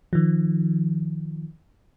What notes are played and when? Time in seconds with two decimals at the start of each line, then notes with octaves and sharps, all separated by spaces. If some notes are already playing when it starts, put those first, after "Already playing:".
0.13 D#3 F3